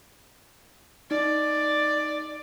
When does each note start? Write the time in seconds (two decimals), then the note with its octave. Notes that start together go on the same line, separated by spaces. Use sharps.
1.11 D#4 D5